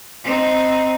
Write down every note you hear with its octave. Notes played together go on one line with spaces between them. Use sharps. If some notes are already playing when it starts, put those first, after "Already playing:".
C4 D#4